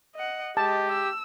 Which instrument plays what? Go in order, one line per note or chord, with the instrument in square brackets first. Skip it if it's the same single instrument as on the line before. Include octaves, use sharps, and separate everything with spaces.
[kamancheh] D#5 F#5
[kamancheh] G#3 D#5 [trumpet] G4 [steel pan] A5
[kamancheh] E6